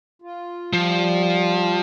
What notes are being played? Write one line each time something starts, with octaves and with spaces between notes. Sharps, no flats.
F4
F3 G3